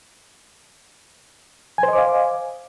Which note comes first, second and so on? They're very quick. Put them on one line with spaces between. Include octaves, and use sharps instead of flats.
G#5 C5 D#5 D6 F5